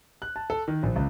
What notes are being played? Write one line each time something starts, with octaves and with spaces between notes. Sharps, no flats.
F#6
A5
A4
D#3
A#1
C#2